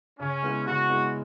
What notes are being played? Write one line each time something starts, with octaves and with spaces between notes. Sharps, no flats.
C#3 C#4
G#3 B3 E4
C#3 F#4
G#3 B3 E4